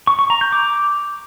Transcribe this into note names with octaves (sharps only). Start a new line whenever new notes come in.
C#6
C#6
A#5
G6
D6